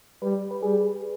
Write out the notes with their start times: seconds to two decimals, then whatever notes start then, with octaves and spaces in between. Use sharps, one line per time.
0.22 G3 B4
0.51 B4
0.62 G3 G#4